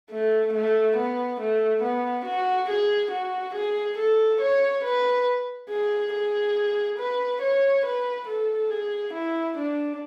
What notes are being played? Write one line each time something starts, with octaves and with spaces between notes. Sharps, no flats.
A3
A3
B3
A3
B3
F#4
G#4
F#4
G#4
A4
C#5
B4
G#4
G#4
B4
C#5
B4
A4
G#4
E4
D4